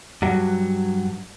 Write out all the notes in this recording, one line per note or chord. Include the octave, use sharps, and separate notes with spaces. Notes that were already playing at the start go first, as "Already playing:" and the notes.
G2 F#3